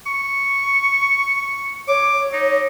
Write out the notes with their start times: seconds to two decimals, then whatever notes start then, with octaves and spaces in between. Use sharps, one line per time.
0.06 C#6
1.88 C#5 D6
2.33 D#4